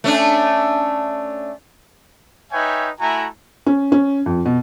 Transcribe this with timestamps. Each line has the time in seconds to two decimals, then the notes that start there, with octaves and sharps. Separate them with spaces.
0.04 A3 C#4 D4
2.52 D#4 B4 C#5 E5 G5 G#5
3.01 A3 E4 F#4 G#5 A#5
3.66 C#4
3.92 C#4
4.26 F2
4.45 B2